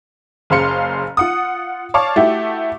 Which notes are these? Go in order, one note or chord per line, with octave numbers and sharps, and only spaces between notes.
F#1 C#3 C5 F5 C6 C#7
F4 F#5 D#6
C#5 D5 F5 A5 C#6 D6
A3 E4 F#4 G4